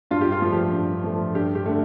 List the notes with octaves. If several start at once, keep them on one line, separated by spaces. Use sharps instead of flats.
G2 F4
G4
F4
F3 A3
G4
G2
F3 A3
G2 G4
G4
D3 A3